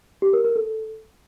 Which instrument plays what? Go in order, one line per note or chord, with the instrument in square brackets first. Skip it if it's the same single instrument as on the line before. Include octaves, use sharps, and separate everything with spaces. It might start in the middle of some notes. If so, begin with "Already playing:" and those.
[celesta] G4
A#4
A#4
A4